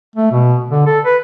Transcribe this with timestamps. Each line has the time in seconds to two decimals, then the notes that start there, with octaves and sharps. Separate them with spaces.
0.16 A3
0.32 B2
0.71 D3
0.86 A4
1.05 B4